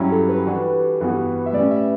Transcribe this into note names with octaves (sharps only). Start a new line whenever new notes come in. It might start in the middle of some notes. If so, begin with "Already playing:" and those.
Already playing: G2 F#3 C#4 E4 G4
A4
B4
E3 G3 D4 F#4
G2 E3 G3 B3 F#4
E5
A2 G3 C#4 D5
E5